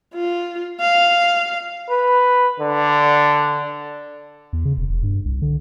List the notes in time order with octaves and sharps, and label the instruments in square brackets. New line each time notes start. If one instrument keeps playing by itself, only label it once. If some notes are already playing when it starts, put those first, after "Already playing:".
[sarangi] F4
F5
[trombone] B4
D3
[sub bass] E2
C#3
E1
E1
G2
C2
D3